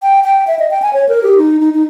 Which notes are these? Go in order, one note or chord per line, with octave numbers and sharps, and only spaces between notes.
G5
G5
E5
D#5
G5
G#5
C#5
A#4
G4
D#4
D#4
D#4